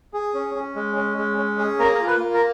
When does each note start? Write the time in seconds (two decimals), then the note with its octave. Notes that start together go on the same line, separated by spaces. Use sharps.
0.14 G#4
0.34 C#4
0.55 C#4
0.76 G#3
0.96 C#4
1.17 G#3
1.37 C#4
1.58 G#4
1.79 A#3 A#4
1.95 A#4
2.00 F4
2.07 B4
2.20 A#3
2.34 A#4